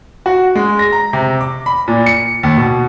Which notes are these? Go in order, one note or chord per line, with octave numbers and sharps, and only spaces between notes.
F#4
G#3
A#6
A#5
C3
D6
B5
A#2
C#7
D#2
B2